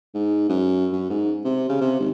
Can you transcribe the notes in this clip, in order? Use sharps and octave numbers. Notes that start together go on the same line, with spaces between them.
G#2
F#2
F#2
G#2
C3
C#3
C3
G#1